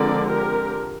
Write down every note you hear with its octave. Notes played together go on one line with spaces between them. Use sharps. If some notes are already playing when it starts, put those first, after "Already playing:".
Already playing: D3 F3 G#3 C4 A#4 D5
G4 A#4